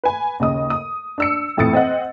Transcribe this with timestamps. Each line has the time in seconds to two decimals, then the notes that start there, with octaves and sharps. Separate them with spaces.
0.04 B4 G#5
0.40 D#2 C#3 D#5 D#6
0.70 D#6
1.18 D4 E6 C#7
1.57 F2 A2 E3 D#6 A6 C#7
1.73 C4 D#5 F#5